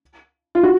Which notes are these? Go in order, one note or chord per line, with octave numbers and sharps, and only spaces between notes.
F4
F#4